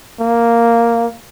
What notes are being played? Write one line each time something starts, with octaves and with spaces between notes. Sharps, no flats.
A#3